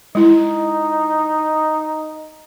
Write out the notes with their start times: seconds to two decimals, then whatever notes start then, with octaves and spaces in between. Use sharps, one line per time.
0.15 G#3 D#4 E4